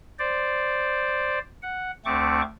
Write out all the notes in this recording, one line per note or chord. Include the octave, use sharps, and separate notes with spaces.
C5 D5
F#5
D2 A3 C4 C#6 D6